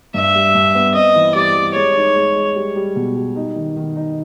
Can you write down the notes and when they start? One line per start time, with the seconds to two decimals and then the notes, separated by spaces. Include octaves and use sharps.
0.14 G2 E5
0.35 G3
0.55 G2
0.75 B3
0.95 C4 D#5
1.16 E3
1.35 G3 D5
1.55 G3
1.75 G#3 C#5
1.96 D#4
2.16 G#3
2.36 G#3
2.56 G3
2.76 G3
2.96 B2
3.16 G3
3.36 D#4
3.56 D#3
3.76 D#3
3.96 D#4